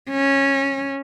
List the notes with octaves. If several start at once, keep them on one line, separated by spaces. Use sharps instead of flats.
C#4